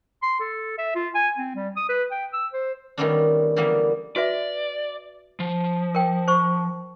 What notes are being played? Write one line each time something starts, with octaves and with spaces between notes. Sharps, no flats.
C6
A4
E5
F4
G#5
C4
G3
D#6
B4
G5
E6
C5
D#3 G3 A3 B3 C#4 D4
D3 E3 G3 A#3 B3 B4
F#4 B4 D5 E5
F3
A#4 G5
C5 C#6